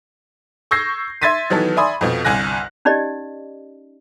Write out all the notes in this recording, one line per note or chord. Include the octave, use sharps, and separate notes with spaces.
C#6 E6 G6 G#6 A#6 C7
E5 C6 G#6 A6 B6 D#7
D#3 E3 F#3 B3 A4
D5 E5 G#5 B5 C6 D#6
F2 B2 F3
G1 C2 G#5 F#6 A#6
C#4 D#4 G4 D5 D#5